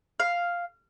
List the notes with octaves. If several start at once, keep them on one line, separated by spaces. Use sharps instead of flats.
F5